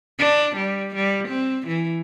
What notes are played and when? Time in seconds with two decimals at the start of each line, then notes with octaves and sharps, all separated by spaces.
0.19 D4
0.56 G3
0.96 G3
1.28 C4
1.67 E3